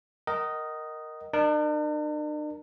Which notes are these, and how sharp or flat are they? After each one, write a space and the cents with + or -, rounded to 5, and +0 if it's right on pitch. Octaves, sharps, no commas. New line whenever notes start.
A#4 +0 D#5 +0 F#5 +45
D4 +45 A#4 +0